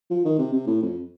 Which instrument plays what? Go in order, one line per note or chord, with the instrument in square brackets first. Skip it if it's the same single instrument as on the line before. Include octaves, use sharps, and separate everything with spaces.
[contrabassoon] F3
D#3
C3
C3
A2
F2